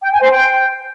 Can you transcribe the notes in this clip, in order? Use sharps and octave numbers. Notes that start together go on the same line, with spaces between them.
G5
G#5
C5
G5